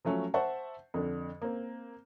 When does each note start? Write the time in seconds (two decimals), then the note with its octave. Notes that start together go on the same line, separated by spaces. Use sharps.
0.05 F3 F#3 A3 C#4
0.34 C5 E5 F#5 A5 C#6
0.94 F2 D3
1.42 A#3 C4